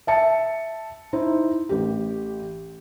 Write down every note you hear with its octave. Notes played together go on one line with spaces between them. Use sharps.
E5 A5 C#7
D#4 E4 C5
A1 G4